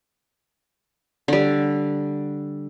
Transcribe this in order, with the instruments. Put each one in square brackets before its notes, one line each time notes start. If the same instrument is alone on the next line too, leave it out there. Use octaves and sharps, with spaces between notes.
[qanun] D3 G3